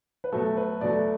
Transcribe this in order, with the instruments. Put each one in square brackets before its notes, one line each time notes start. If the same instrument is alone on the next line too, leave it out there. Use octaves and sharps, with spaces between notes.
[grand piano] B4
B2 F#3 A3 A4
B4
B2 F#3 A3 D5